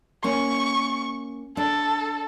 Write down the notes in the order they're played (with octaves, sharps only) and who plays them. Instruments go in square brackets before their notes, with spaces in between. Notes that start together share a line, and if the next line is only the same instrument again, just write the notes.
[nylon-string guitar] A#3 C#4 [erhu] C#6
[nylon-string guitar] D4 [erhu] A4